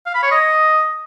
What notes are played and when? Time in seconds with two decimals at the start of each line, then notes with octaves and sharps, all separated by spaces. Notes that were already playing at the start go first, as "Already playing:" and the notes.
0.06 F5
0.15 B5
0.23 C#5
0.31 D#5